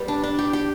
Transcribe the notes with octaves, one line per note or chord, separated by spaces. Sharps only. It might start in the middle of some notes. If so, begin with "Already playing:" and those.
Already playing: G3 B3 B4
D4
D4
G4
G4